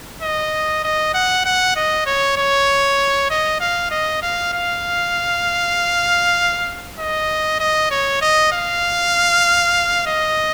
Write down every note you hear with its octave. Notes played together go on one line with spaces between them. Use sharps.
D#5
D#5
F#5
F#5
D#5
C#5
C#5
D#5
F5
D#5
F5
F5
D#5
D#5
C#5
D#5
F5
D#5